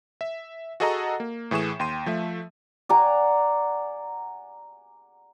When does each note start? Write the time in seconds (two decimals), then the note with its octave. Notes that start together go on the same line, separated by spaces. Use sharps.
0.21 E5
0.80 F#4 G#4 A4 D#5 F#5 A#5
1.20 A#3
1.51 A2 E3 G#4 C#6 E7
1.79 D#2 G5 C6 D#7
2.06 F3 A3 E5
2.89 D5 F#5 G#5 A#5